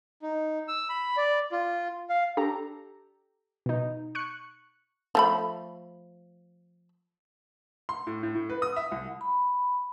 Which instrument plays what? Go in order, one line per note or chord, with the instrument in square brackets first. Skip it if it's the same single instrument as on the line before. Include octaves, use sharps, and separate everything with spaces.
[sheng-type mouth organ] D#4
E6
B5
D5
F4
F5
[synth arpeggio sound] D4 G4 A4 A#5
B2 D#4
C#6 F#6 C#7
[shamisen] F3 A3 B5
[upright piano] C6
A2
A2
A2
B4
D#6
E5
C2
[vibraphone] B5